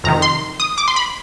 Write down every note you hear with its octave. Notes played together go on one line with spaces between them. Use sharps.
F2 C3 D#3 A#5
C6
D#6
D6
C6
B5